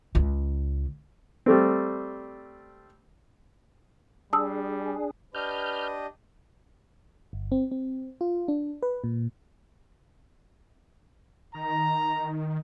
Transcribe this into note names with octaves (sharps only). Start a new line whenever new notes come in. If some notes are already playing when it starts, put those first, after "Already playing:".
C#2 C#3
G3 A3 C4
G3 D4 G#4 A5 D#6 E6
D4 G4 B4 D#5 F6 G6
G1
C4
C4
F4
D4
B4
A#2
D#3 A#5